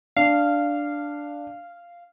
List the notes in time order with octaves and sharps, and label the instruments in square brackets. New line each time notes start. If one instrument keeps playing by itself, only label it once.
[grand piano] D4 [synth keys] F5